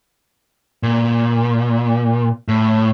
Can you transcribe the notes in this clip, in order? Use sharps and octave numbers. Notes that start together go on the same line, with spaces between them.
A#2
A2